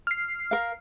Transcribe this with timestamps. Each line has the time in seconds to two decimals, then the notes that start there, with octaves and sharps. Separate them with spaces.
0.07 F6 C7
0.51 A#4 F5